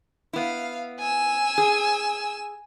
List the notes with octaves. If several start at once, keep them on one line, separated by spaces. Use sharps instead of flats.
B3 E4 F5
G#5 E6
G#4